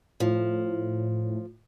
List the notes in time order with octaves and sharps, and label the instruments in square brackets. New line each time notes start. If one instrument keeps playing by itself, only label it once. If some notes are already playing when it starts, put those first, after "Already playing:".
[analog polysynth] A2 [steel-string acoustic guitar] F3